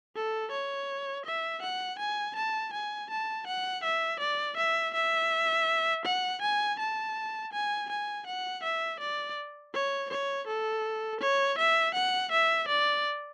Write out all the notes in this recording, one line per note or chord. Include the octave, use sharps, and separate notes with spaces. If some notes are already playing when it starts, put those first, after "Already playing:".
A4
C#5
E5
F#5
G#5
A5
G#5
A5
F#5
E5
D5
E5
E5
F#5
G#5
A5
G#5
G#5
F#5
E5
D5
C#5
C#5
A4
C#5
E5
F#5
E5
D5